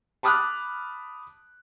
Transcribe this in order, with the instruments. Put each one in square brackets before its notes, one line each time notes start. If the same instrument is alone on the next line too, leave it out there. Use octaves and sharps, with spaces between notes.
[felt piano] A5 B5 D6 D#6 F6 F#6